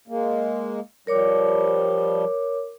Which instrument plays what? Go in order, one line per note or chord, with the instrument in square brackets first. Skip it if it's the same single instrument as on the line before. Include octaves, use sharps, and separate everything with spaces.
[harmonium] G#3 A#3
[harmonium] F3 G3 [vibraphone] A#4 C#5 D6